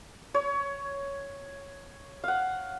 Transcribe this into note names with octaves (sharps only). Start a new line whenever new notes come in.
C#5
F5 F#5